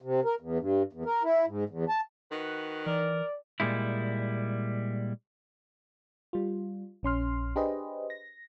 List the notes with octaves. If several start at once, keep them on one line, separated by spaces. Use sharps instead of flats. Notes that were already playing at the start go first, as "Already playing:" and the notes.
C3
A#4
E2
G2
E2
A#4
E4
G#2
E2
A5
D#3 F#4 B4
E3 A#4 D5
A#2 G3 G#3 E4
G3 F4
A#1 C#4 C6 F6
D4 G4 G#4 B4 C5 D#5
A#6